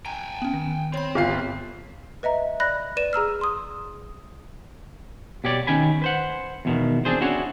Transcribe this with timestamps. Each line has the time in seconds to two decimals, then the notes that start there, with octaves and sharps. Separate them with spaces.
0.06 G5 G#5 A#5
0.42 B3 C#4
0.54 D#3
0.94 C4 C#5 B5
1.15 G1 F4 C7
2.23 B4 D#5 E5 A#5
2.60 D5 B5 F#6 A#6
2.97 B4 D5 D#7 E7
3.13 G#4 A#5 E6 F6
3.41 C6 D#6
5.44 B2 G4 C#5 D5
5.67 D#3 C#4 G5 G#5 B5
6.02 B4 C5 F#5
6.65 E2 B2 D#3
7.05 C4 D4 G#4 C5
7.21 C#4 D4 E4 F#4 G#4 C#5